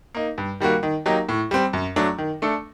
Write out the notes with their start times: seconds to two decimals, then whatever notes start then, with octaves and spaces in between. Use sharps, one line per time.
0.15 A#3 D#4
0.38 G2
0.60 D#3 G3 A#3 F#4
0.83 D#3
1.06 F#3 A#3 D#4 G4
1.29 A2
1.51 G3 C4
1.73 F#2
1.96 F#3 A3 D4
2.18 D#3
2.42 A3 D4 A4